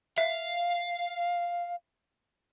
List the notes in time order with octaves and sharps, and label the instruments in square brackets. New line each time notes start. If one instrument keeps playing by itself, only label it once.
[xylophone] E5 [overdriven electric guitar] F5